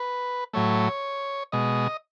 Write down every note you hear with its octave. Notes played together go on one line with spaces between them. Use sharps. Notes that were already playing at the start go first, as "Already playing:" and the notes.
Already playing: B4
A2 F#3 A3 C#5
B2 G#3 D#5